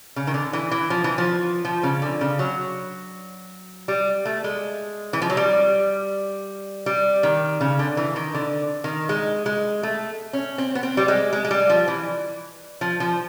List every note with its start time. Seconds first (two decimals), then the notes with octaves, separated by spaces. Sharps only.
0.16 C#3
0.27 D#3
0.34 D3
0.53 E3
0.71 E3
0.90 F3
1.04 E3
1.18 F3
1.65 F3
1.83 C#3
2.02 D3
2.21 C#3
2.39 F#3
3.88 G3
4.25 A3
4.44 G#3
5.13 E3
5.22 F3
5.30 F#3
5.37 G3
6.86 G3
7.23 D#3
7.61 C#3
7.79 D3
7.97 E3
8.16 D#3
8.34 D3
8.84 D#3
9.09 G#3
9.46 G#3
9.83 A3
10.33 C#4
10.58 C4
10.75 B3
10.83 C4
10.97 G3
11.08 G#3
11.33 G#3
11.45 G#3
11.51 G3
11.70 F3
11.88 E3
12.81 F3
13.00 F3